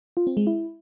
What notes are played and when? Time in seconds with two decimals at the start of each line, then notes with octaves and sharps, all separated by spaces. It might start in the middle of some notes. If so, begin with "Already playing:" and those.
0.17 F4
0.27 C4
0.37 G#3
0.47 E4